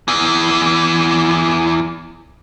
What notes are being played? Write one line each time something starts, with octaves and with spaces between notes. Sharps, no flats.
E2 E3